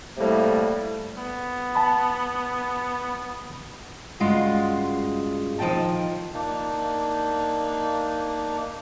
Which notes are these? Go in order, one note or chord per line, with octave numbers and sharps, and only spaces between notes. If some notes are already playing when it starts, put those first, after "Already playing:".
A2 C3 G3 A3 A#3
B3
A5 B5
G2 C#3 G#3 F4 F#4
D#3 F3 D#4 D#5 G5 A5
A#3 D4 D#4